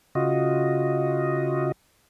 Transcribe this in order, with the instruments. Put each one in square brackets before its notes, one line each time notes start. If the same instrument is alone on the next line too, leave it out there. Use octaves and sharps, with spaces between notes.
[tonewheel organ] C#3 F4 F#4 D#5